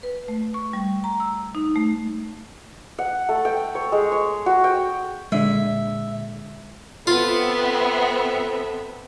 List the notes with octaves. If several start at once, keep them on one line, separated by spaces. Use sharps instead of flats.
B4
A3
C#6
G3
A#5
E6
D#4
A3
F#5
A3
G5
C#5
G#3
C#5
F#4
G5
A#2 D3 G#3 E5
B3 C4 F4 A4 E5